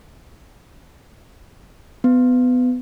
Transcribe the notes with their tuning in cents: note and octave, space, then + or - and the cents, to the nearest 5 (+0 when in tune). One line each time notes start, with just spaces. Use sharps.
B3 +20